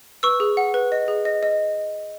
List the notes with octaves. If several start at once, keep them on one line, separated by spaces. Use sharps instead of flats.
B4 C#6 E6
G#4
F#5
B4
D#5
G#4
D#5
D#5